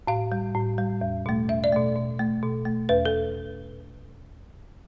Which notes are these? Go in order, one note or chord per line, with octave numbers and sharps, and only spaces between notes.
A2 F5
G3
A2
G3
E2
B2 A3
E2 E5
D5
B2 A3
B2
A3
B2
A3
E2 B4
A4